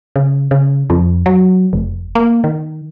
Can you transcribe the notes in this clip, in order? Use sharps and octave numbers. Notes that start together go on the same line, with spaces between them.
C#3
C#3
F2
F#3
F1
A#3
D#3